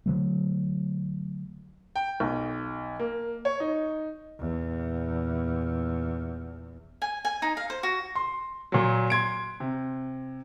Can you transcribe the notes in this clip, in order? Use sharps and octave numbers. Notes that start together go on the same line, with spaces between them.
D3 F#3 A3
G5
B1
A#3
C#5
D#4
E2 A#2
G#5
G#5
D#4
F5
C5
F#4
C6
A#2 F#3
C6 G#6 D7
C3